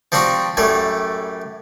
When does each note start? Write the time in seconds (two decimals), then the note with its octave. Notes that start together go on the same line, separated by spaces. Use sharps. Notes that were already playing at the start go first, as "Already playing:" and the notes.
0.12 F3 G3 C4 D4 F#4
0.57 F#2 A2 G3 A3